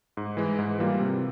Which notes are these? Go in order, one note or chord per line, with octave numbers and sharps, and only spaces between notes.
G#2
E3 G#3
G#2
E3 G3 A#3 F4
C3